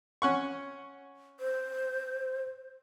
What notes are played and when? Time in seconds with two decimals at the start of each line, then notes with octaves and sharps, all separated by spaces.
0.22 C#4 F#5 C#6
1.40 C5